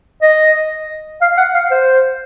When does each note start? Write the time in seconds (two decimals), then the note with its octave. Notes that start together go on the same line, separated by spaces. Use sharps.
0.22 D#5
1.21 F5
1.37 F#5
1.54 F5
1.71 C5